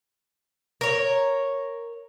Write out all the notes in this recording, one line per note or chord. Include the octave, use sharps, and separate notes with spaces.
A#4 C#5